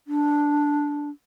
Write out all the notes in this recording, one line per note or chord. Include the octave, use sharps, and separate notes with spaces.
D4